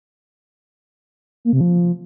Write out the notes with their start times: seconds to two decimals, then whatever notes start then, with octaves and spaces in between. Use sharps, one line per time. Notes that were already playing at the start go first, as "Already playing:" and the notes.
1.45 A#3
1.53 C3
1.61 F3